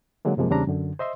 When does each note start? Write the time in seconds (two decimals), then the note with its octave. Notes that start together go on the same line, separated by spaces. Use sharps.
0.25 D3 F#3 G#3 A#3
0.37 F#2 C3 F3 G#3 A#3
0.50 E2 C#3 G3 C4 D4 A#5
0.67 F#2 D3
0.99 C5 D#5 E5 C6